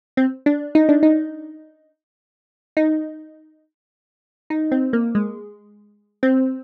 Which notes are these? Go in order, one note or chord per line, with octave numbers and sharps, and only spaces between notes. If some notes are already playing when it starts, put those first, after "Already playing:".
C4
D4
D#4
D4
D#4
D#4
D#4
C4
A#3
G#3
C4